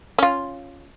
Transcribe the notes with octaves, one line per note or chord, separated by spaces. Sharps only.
C#4 F4